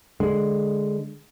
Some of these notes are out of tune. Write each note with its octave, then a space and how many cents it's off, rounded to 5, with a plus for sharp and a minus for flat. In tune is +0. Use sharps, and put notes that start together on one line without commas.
D3 +0 G#3 +0